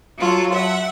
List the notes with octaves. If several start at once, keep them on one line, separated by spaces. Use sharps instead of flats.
F#3 F4 A4
E5 F#5